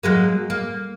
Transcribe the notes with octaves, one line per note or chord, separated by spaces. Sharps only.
F#3 G#3 A#3
A#3